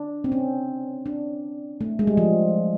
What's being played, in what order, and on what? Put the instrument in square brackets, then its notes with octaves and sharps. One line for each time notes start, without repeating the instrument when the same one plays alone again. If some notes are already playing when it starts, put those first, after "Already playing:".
Already playing: [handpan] D4
C4
C#4
D4
A3
G#3
G3
F3